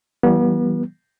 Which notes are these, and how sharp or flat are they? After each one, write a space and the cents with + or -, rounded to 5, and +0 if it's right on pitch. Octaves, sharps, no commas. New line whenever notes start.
E3 +0 G3 -30 B3 -35